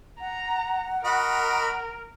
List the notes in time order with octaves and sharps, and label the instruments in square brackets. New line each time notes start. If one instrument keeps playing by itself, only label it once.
[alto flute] F#5 [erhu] A#5
[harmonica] F#4 D#5 B5 [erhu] A#4